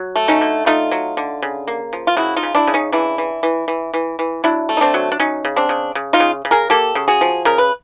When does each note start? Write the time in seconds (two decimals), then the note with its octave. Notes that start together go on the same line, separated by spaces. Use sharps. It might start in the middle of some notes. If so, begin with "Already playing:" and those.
Already playing: F#3
0.16 A3
0.28 C#4 D#4
0.41 D3
0.66 A3 D#4 F4
0.91 F#3
1.17 D3
1.42 C#3
1.67 A#3
1.93 F3
2.07 F4
2.17 C#3 E4 F#4
2.36 D#4 F4
2.43 C#3
2.55 D4 E4
2.67 C#3
2.74 C#4 D#4
2.92 E3 D4 E4
3.18 E3
3.43 E3
3.68 E3
3.94 E3
4.19 E3
4.44 F#3 D4 E4
4.69 A3
4.77 D#4
4.81 C4 D4
4.94 F#3
5.12 D4
5.20 F#3 C#4 D#4
5.45 C#3
5.56 C4 D4
5.69 C#3
5.95 C#3
6.13 D#4 F4
6.20 C#3
6.45 C#3
6.51 G#4 A#4
6.70 A#3 G4 A4
6.95 C#3
7.08 F#4 G#4
7.21 F3
7.45 C#3 A#4
7.58 B4